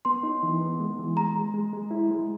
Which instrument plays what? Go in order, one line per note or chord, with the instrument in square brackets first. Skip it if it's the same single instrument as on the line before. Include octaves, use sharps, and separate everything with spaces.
[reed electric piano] B3 [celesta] C6
[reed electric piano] D#4
E3
B3
G#3
E3
[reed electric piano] G#3 [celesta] A#5
[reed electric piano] G#3
G#3
G#3
E4
G#3